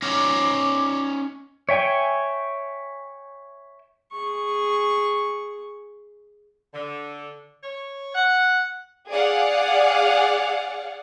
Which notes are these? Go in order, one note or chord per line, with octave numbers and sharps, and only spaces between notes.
C#4 D#4 D6
C#5 E5 G5 G#5
G#4 C#6
D3
C#5
F#5
G#4 D5 F5 F#5